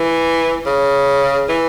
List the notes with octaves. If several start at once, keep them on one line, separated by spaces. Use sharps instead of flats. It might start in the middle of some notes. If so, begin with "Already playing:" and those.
Already playing: E3
C#3
E3